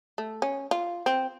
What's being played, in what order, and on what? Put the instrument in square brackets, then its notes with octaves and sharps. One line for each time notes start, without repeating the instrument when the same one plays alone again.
[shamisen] A3
C#4
F4
C4